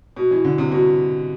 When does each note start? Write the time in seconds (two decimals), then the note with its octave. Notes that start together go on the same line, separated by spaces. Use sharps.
0.16 B2
0.31 E3
0.45 D3
0.58 C3
0.72 B2